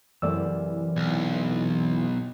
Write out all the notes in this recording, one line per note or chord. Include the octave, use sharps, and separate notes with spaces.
F#2 C3 E3 A3 D5 E6
B1